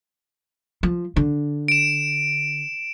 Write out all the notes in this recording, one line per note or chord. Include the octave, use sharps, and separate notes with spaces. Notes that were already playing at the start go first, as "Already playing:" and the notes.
F3
D3
D7 E7